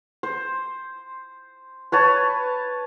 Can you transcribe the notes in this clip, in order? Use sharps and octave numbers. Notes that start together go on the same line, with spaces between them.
C5
B4 C#5 A5